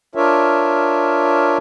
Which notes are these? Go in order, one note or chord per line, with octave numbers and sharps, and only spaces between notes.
D4 F4 A#4 C#5 E5